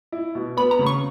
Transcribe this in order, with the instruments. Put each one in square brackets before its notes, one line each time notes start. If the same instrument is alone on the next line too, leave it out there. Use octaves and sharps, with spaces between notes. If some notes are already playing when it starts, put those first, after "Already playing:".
[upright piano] E4
B2
[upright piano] B3 [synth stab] B5
[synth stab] A#5
[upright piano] C#3
[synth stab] C#6